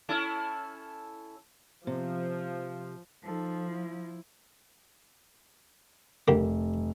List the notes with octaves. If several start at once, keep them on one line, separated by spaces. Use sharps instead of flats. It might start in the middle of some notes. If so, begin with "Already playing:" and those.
C#4 E4 A4
C3 F3
F3 D#4 A4
E4
F1 D3 G3 A#3